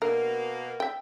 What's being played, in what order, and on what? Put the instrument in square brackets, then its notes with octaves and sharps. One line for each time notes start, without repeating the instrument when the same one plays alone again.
[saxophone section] B2 A#3 [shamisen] D3 A#4
[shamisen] E5 G5